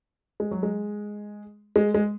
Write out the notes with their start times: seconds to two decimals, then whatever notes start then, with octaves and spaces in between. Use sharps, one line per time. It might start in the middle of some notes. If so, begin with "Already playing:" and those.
0.40 G#3
0.51 F#3
0.63 G#3
1.76 G#3
1.95 G#3